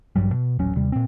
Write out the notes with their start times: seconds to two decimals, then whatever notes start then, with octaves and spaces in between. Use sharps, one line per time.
0.16 A1 G2 F#3 G3
0.33 B2
0.59 D#1 A1 F#3 C#4
0.75 D#2 C3 G3
0.92 A#2 C4